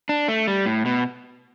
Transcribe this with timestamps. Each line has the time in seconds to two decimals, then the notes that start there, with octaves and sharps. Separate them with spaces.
0.09 D4
0.28 A3
0.47 G3
0.66 A2
0.85 B2